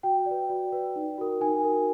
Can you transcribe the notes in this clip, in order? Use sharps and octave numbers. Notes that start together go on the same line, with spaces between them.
F#4 G5
B4 D5
F#4
B4 D5
D#4
F#4 A#4
D#4 G#5
F#4 A#4